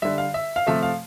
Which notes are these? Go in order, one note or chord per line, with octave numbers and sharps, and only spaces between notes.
D3 G3 E5
F5
E5
F5
C3 F3 A3 E5
F5